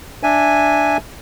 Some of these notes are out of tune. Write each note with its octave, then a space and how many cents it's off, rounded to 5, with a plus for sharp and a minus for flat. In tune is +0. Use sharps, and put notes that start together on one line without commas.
D4 +0 E5 +0 G#5 -5